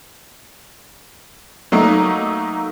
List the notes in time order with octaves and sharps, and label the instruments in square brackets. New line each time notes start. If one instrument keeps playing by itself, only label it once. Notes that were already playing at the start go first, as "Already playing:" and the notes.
[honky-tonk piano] F#3 A3 A#3 D#4